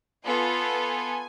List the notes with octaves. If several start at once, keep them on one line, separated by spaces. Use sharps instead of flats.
B3 F4 A4 G#5